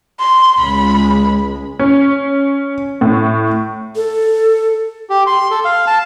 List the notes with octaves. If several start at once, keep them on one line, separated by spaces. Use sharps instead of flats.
C6
C#2 G#3 B5
C#4
A2
A4
G4
C6
A4
F5
A5